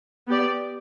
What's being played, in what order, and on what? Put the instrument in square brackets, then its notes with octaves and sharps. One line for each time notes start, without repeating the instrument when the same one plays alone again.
[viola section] B3 G4 D5